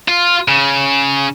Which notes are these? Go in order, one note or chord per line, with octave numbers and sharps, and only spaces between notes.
F4
C#3